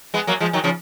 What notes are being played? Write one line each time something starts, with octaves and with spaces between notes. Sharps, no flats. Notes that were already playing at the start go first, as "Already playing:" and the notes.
G#3 B3
F#3 A#3
F3 G#3
D#3 F#3
C#3 F3